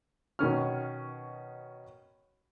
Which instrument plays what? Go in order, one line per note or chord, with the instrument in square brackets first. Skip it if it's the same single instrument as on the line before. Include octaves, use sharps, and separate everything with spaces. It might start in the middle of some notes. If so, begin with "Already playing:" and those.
[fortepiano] B2 D#3 C#4 F6